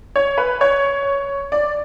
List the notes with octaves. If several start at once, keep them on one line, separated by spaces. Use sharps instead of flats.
C#5
B4
C#5
D5